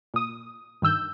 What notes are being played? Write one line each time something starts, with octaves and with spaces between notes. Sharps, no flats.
A#2 D#6
G2 D#3 E6 G6